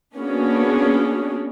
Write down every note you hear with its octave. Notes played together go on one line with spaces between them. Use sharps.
A#3 B3 C#4 D4 F#4 G#4